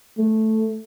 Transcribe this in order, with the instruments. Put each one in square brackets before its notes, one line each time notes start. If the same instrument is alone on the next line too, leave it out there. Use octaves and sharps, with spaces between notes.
[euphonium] A3